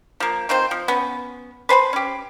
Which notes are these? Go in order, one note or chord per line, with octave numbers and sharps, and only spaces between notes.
F3 A#3
D#3 C4 F4 C5
F3
B3 C#4
B4 C5 G#5 B5
C#4 G4